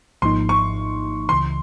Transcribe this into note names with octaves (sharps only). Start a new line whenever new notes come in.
G#1 G#2 F3 A#3 D#4 C6
C#6
C#2 C#3 E3 C6